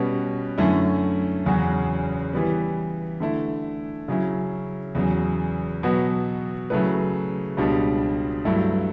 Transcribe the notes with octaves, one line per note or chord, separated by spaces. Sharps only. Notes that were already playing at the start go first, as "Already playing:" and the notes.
Already playing: B2 G3 C#4 F#4 B4
F#2 D3 A3 C#4 E4
E2 C#3 F#3 C#4 F#4
E3 G3 B3
D3 A3 E4
C#3 F#3 C#4 E4
E2 C#3 F#3
B2 F#3 B3 F#4
C#3 F#3 A3 E4 B4
C#2 B2 G3 D4
G2 F#3 A3 E4